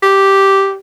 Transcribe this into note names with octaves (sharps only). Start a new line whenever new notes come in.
G4